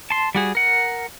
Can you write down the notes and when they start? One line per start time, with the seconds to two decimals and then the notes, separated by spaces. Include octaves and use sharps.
0.10 A5 C6
0.35 G3 F#4 G#4
0.55 A#4 F#5